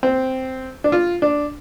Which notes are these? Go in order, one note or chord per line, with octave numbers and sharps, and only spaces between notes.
C4
D4
F4
D4